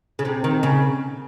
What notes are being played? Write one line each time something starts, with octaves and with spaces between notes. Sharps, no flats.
C#3
C3
D#3
C#3